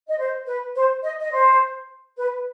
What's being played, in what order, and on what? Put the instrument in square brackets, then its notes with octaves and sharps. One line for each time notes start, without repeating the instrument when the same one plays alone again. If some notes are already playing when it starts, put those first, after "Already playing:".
[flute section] D#5
C5
B4
C5
D#5
D#5
C5
B4